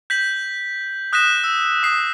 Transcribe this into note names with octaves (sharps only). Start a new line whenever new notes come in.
G6 B6 F#7
D#6 F#6 G6 A#6 B6 E7
E6
D#6 C7